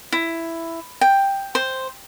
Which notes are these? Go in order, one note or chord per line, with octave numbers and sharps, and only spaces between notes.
E4
G5
C5